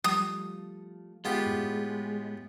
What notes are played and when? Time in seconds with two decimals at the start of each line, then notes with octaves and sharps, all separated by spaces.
0.04 F3 G3 A3 D#6
1.25 G#3 B3 F4 G4
1.46 A2